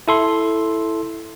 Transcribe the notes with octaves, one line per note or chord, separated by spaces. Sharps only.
E4 A4 C6